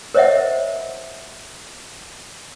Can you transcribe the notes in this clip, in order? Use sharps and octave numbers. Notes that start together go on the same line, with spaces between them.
A#4 C5 C#5 D#5 E5 F#5